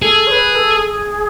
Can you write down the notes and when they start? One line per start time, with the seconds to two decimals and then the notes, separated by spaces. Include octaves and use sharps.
0.02 G#4 A4
0.27 C#5
0.32 B4
0.51 B4
0.56 A4
0.76 G#4